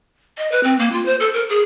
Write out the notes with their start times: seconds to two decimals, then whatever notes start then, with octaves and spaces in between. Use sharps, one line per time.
0.38 D#5
0.52 B4
0.63 C4
0.79 A#3
0.92 F4
1.05 C5
1.20 A4
1.33 A#4
1.49 G#4